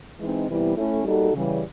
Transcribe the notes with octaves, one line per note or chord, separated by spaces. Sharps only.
E3 G#3 C4 D#4
C3 E3 G3 B3 E4
A3 C#4 E4
G3 A#3 D#4 F#4 A4
C#3 E3 G3